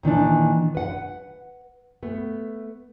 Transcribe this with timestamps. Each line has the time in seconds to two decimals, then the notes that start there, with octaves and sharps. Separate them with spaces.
0.03 A#2 D#3 E3 D4
0.75 B4 F#5
2.03 A3 B3